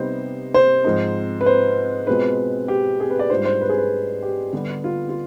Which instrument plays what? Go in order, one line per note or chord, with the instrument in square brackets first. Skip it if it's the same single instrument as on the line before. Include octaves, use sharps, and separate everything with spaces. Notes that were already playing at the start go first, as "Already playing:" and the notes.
Already playing: [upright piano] C3 G3 B3 D#4 C5
C5
G#2 F3 C4 D#4
B4
C5
B2 G#3 C4 F4 B4
G4
G#4
B4
D5
G#2 G3 D4 F4 C5
C5
B4
G#4
B4
G4
D3 G3 B3 D4
F4
F4